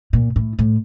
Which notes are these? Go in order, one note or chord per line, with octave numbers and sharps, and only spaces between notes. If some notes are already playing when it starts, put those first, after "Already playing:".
A#2
A2
A2